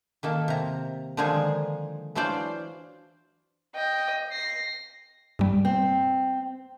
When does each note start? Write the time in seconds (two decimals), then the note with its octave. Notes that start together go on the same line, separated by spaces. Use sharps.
0.23 D#3 A#3 A4
0.48 C3 A#5
1.17 D3 D#3 F3 G#3 D#4 G#4
2.15 E3 F#3 D4 F4 C5 D5
3.75 D#5 G5
4.32 A#6 C7
5.39 G2 G3
5.65 C4